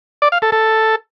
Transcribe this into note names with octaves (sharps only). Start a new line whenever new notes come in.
D5
F5
A4
A4